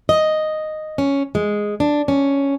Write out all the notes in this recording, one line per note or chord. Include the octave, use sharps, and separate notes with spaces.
D#5
C#4
G#3
D4
C#4